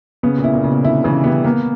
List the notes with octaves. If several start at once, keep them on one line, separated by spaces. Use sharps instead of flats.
C#3 B3
A#2
E4
A#2
C#3
B2
D3 E4
C#3 E3
G3 B3
A#3 B3